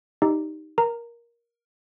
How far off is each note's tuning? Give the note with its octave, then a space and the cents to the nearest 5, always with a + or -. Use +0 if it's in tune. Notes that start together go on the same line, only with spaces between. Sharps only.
D#4 +0 G4 +0 D5 -15
A#4 +15 A#5 -15